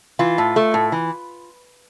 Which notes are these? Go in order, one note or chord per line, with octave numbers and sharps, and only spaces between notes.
E3 F4
A2
A3
A2
E3